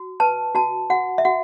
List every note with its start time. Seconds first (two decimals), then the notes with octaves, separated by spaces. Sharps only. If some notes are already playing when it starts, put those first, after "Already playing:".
Already playing: F#4
0.20 B4 A5
0.55 F#4 A5
0.90 F#4 F#5
1.18 E5
1.25 F#4 F#5